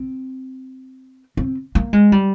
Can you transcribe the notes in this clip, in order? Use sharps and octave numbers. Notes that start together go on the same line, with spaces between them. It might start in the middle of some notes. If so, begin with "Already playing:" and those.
Already playing: C4
C4
A#3
G#3
G3